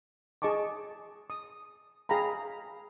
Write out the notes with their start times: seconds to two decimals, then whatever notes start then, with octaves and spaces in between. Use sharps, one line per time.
0.42 G#4 D#5 A5 C#6 D6
1.30 D#6
2.09 G#4 F5 G5 A#5 B5